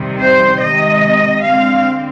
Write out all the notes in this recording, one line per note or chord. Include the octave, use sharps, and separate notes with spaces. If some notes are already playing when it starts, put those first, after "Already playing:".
Already playing: C3 D#3 G3
C5
C3 D#3 G#3 D#5
D3 G#3 C4 F5